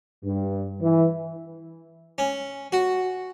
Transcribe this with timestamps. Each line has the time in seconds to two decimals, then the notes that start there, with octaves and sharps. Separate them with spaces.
0.24 G2
0.81 E3
2.18 C#4
2.72 F#4